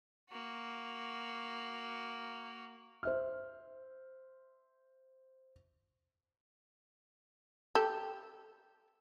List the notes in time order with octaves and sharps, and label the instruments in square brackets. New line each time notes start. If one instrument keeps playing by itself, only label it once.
[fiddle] A#3 F#4
[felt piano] C5 E5 F6
[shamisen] G4 A4